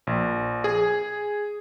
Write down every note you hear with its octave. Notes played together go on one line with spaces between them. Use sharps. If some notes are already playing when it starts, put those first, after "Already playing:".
A#1
G#4